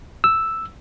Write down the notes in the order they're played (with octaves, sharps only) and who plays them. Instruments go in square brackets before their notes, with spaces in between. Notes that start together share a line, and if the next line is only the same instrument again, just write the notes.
[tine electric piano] E6